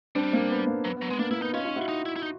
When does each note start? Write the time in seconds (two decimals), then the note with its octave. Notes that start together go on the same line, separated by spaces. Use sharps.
0.15 G3 C4 D4
0.33 A#3 C4
0.51 B3
0.67 A#3
0.85 F#3 B3
0.97 B3
1.02 F#3
1.08 G#3 B3
1.19 A#3 D4
1.31 A#3 E4
1.42 B3 D#4
1.53 C#4 D#4 F4
1.65 D#4 F4
1.76 E4 F#4
1.89 D#4
2.06 E4
2.16 E4
2.23 D#4